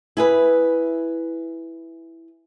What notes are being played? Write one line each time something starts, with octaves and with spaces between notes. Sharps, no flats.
E4 G#4 B4